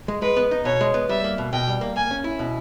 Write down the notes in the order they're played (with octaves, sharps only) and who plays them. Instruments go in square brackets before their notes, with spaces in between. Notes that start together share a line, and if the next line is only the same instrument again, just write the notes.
[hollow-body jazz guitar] G#3
[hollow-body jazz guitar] G#3 [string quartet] B4
[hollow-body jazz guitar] B3
D#4
[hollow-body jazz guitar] B2 [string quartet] C#5
[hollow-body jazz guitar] G#3
B3
[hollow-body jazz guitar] G3 [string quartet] E5
[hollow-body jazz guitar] A#3
B2
[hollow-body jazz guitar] B2 [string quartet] G5
[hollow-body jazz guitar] G3
A#3
[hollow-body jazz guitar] A#3 [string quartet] G#5
[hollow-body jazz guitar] C#4
E4
B2